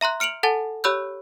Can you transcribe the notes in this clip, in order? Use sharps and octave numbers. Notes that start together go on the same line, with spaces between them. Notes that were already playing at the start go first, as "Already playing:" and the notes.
E5 A#5 C6 F#6
F6 C#7 D7 F7 F#7
A4 F#5 G#5 A5 A6 G7
G4 C#5 B5 E6 F#6 G6